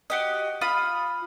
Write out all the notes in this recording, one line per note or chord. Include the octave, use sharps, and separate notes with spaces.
F#4 G4 D#5
F4 B5 D#6